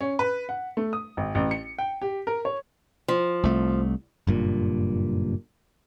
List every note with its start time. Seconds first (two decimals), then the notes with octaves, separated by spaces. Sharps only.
0.01 C#4
0.19 B4
0.49 F#5
0.77 A3
0.93 D#6
1.17 G#1
1.35 A1
1.51 C#7
1.78 G5
2.02 G4
2.27 A#4
2.45 C#5
3.08 F3
3.43 C2 A3
4.27 F#1 G2 A#2